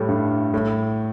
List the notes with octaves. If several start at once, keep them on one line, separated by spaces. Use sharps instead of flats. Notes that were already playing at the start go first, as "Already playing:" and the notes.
Already playing: A2 G3 A3
G2
A2